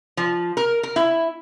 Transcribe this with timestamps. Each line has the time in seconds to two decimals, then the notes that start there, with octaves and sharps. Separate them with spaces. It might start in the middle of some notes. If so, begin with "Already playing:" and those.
0.17 F3
0.57 A#4
0.83 A#4
0.96 E4